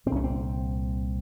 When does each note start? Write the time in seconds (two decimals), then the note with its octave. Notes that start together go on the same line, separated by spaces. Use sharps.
0.06 A#2 C4
0.11 C2 C#4
0.24 C4